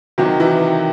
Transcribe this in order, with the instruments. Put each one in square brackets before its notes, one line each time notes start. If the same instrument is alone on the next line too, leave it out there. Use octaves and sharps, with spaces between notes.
[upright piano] C3 D#3 F#3 F#4
E3 E4